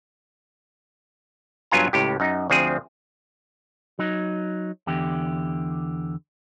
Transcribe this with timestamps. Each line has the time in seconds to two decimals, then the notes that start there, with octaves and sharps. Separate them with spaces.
1.71 G2 F#3 B3 F4 G#5 A#5
1.93 C#2 A2 G4
2.20 F#2 D#4
2.50 D2 F3 C4 G#4
3.99 F#3 D#4
4.87 E2 D3 G4